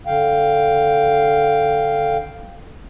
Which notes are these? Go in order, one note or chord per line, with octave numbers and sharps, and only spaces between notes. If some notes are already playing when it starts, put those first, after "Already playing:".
D3 F5 G5